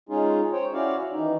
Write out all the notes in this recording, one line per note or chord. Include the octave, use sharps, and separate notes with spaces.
G#3 C#4 D#4 F4 G#4
C5 C#5 G5
C#4 E4 F#4 D5 F5
D#3 E3 D#4